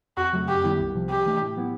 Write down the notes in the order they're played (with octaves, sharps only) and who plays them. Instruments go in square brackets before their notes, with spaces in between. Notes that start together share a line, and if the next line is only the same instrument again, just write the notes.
[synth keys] F2 [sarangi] F#4
[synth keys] C#3 F#3 A3
[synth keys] F#2 [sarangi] G4
[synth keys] D#3 G3 B3 E4
C2
C3 F3
[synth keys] C3 [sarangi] G4
[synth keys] E3 A3 D4
A2
F#3 B3 E4